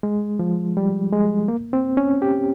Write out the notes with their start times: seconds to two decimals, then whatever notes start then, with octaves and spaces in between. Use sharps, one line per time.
0.03 G#3
0.39 F3
0.77 G3
1.12 G#3
1.48 A#3
1.73 C4
1.97 C#4
2.22 G4